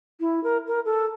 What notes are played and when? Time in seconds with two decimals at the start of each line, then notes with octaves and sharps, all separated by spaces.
0.20 E4
0.44 A#4
0.67 A#4
0.85 A4